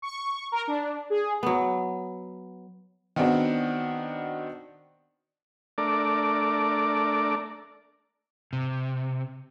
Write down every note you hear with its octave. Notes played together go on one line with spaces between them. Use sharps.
C#6
A#4
D4
G#4
F#3 B3
D#3 B3 C4 D4 F#4
A3 D4 A#4 D5
C3